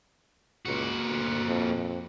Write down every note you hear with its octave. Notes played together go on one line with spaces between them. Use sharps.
C#2 A#2 F#4
D2
F2